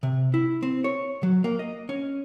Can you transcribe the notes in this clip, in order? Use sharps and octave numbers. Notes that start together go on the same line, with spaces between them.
C3
E4
C4
C#5
F#3
A#3
D#5
C#4